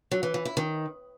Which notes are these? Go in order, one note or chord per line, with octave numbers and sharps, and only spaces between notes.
F#3
E3
E3
E4
D#3